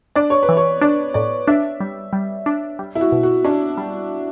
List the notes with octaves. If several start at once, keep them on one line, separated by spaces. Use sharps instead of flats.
D4 D5
C#5
B4
E3
C#5
D4 D5
A2 D5
D4 E5
G3
G3
D4
G3
E4
F#4
B2
F#4
C#4 D4
G3